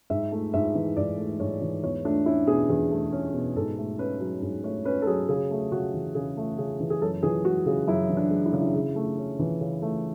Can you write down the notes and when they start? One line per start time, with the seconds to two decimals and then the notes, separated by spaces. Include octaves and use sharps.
0.10 G#2 E5
0.32 A3
0.54 G#2 E5
0.75 E3
0.97 G#2 D5
1.18 A3
1.40 G#2 C#5
1.61 E3
1.84 E2 C#5
2.05 A3 D4
2.26 C#4 E4
2.47 B2 G#4
2.69 E2 G#4
2.91 A3
3.12 C#4
3.34 B2
3.56 G#2 A4
3.78 A3
3.99 C#4 B4
4.21 F#3
4.42 G#2
4.64 A3 C#5
4.85 C#4 B4
5.02 A4
5.07 F#3 G#4
5.29 C#3 G#4
5.51 A3
5.72 C#3 F#4
5.94 E3
6.15 C#3 G#4
6.37 A3
6.58 C#3 G#4
6.80 E3
6.90 G#4
7.02 F#2 A4
7.23 E3 G#4
7.45 G#3 F#4
7.66 C#3 G#4
7.87 F#2 E4
8.10 E3
8.17 D4
8.31 G#3
8.45 E4
8.53 C#3 D4
8.61 E4
8.74 C#3
8.96 A3
9.18 C#4
9.39 E3
9.61 C#3
9.82 A3